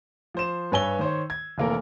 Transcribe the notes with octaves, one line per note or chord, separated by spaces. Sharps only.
F3 C5 E7
G2 B4 C#5 G#5 E6 G7
D#3 C5 C#5
G#6
F1 E3 A#3 A4 A#4